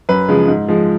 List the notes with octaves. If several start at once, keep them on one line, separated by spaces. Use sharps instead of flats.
F#2 B4
C#3 F3 G#3
G#2
F3 G#3